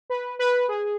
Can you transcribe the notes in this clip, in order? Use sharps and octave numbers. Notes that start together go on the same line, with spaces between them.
B4
B4
G#4